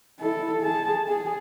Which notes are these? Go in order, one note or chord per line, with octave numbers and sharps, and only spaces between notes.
E4 A4
G#4 A5
G#4